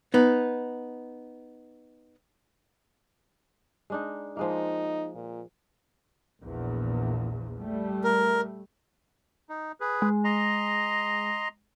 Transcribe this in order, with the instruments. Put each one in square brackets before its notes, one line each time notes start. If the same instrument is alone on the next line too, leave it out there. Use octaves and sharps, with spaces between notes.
[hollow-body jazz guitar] B3 D#4
[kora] G#3 D4 D#4
[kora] F3 G#3 A#3 [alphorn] D#4
[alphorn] A#2
[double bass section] A#1 E2 A#2
G3 A3
[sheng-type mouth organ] A#4
[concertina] D#4
G#4 B4
[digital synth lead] G#3
[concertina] D#5 A#5 C6